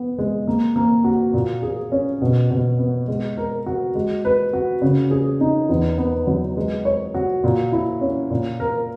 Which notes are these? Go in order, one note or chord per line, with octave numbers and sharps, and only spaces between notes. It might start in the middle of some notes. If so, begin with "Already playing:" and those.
Already playing: B3
G#3
A#3
A#3
F#4
A#2
G#4
C#4
B2
B2
B3
G#3
A#4
F#4
G#3
B4
F#4
C#3
G#4
D#4
E2
B3
F#3
G#3
C#5
F#4
A#2
E4
C#4
A#2
A#4